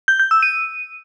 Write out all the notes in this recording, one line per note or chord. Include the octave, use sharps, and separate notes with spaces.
G6
G6
E6
D#7